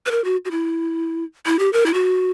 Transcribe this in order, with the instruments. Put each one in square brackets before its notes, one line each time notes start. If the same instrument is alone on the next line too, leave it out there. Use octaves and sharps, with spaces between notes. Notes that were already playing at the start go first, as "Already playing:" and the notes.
[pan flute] B4
A#4
F#4
F#4
E4
E4
G4
A#4
E4
F#4